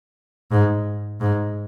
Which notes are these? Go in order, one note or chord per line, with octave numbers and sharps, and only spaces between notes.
G#2
G#2